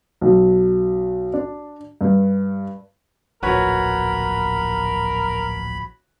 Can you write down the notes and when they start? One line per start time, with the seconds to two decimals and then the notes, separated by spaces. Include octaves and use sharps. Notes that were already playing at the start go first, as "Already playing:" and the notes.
0.21 B1
1.34 D4
2.01 G2
3.43 D1 A#1 F#4 A#4 B4 C#5 B5